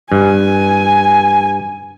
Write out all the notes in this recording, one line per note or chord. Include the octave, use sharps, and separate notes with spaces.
G2 G#5